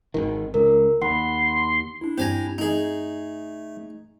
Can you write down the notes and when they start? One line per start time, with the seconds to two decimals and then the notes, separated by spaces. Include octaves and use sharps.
0.14 G#1 D#3
0.54 C#2 A#4
1.02 D#2 F#5 B5 C6
2.01 D4 E4
2.18 G2 C4 G4 G#5 A#5
2.58 A3 D#4 G#4